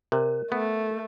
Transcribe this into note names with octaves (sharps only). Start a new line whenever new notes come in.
C3 A#4
A3 B3